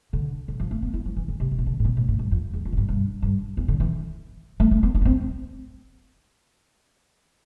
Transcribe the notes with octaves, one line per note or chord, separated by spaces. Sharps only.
D3
D3
F3
A3
B3
E4
F3
E3
D3
C3
D3
C3
D3
A2
B2
A2
A2
G2
F2
E2
F2
A2
G2
G2
G2
E2
D3
E3
A3
A3
B3
D4
B3
C4